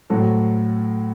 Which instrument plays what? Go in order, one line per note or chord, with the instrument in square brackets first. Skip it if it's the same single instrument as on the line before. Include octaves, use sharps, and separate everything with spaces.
[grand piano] A2 F#3 C4 F#4 A4